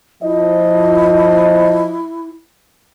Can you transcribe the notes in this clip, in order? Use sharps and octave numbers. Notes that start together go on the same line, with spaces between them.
F3 E4 D#5